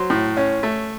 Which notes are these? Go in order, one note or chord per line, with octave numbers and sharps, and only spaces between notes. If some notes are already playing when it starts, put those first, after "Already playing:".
Already playing: F#3 C5
A2
C#4
A3